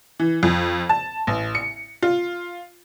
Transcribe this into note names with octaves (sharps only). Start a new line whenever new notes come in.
E3
F2
A5
A1
C#7
F4